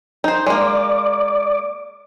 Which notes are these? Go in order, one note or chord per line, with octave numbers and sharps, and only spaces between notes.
D#4 C5
G#3 A#3 D5